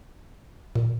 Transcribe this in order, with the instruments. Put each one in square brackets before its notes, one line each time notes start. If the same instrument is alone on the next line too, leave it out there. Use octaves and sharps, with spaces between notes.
[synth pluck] A#2